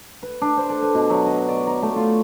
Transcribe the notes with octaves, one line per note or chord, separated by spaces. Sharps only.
B4
D4
C5
A4
B4
B2
F#3
D#5
D5
A#5
A3
F4